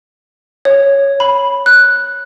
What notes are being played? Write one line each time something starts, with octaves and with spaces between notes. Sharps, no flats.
C#5
B5
F#6